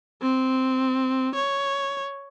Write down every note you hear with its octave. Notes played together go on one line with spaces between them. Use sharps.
C4
C#5